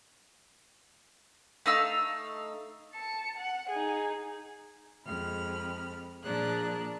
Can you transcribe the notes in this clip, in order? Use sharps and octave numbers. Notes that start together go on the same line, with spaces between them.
A3 D#4 F5 E6
A5 C#7
F#5
D#4 G#4
F2 G#3 B5 F6
A#2 F3 D4 G#4 A#4 F#6